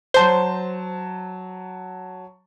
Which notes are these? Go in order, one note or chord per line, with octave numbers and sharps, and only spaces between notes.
F#3 C5 A5 G7